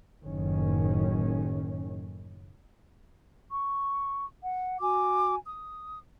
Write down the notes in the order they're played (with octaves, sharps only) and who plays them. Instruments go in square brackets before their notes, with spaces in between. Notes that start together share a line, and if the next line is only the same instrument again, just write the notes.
[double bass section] F#1 A2 D#3 C#4
[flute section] C#6
F#5
F#4 G#5 D6
D#6